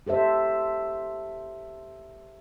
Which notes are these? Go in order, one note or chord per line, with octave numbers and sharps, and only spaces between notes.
G4 A4 C5 E5